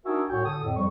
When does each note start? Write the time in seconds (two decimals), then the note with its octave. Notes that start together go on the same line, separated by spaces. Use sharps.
0.06 D4 D#4 F#4 A#4 E5 G#5
0.29 C2 A2 F#4 C#5 G5 G#5
0.45 D3 A4 D#6
0.63 F2 A2
0.77 F2 F3 G3 C#6